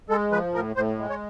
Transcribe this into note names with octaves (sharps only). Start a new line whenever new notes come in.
G#3 A4
F3 B4
A2 A#4
A2 C5
G#3
C#5